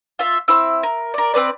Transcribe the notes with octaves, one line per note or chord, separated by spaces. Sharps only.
F4 E5
C4 E4 E6
A#4
A#4 D5
C4 C#4 B4 D5